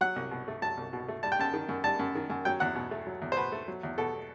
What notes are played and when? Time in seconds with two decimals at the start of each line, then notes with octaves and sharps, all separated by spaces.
0.01 F#3 F#5
0.16 C2
0.31 B2
0.48 A3
0.62 F#3 A5
0.77 C2
0.93 B2
1.08 A3
1.23 G3 A5
1.32 G5
1.39 F#2 A5
1.54 D#3
1.69 F#2
1.84 G3 A5
1.99 F#2
2.15 D#3
2.30 F#2
2.45 F#3 G5
2.60 E2 F#5
2.75 B2
2.91 A3
3.07 F#3
3.22 E2
3.32 C5
3.37 B2 B4
3.52 A3
3.68 F#3
3.83 E2
3.98 B2 A4